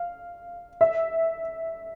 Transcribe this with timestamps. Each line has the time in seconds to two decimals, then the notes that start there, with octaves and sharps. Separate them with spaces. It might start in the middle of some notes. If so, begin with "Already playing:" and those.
Already playing: F5
0.81 E5